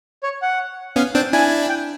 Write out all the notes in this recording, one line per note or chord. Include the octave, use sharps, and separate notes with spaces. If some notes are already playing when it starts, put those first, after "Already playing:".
C#5
F#5
B3 C#4 F5
C4 D4 G5
D4 E4 G#5
G5